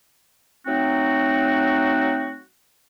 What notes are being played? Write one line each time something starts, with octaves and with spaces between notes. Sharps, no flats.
F#3 A3 C4 D#4 F#4